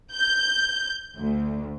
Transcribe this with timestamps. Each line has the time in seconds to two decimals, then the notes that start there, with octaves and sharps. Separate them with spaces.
0.14 G6
1.16 D2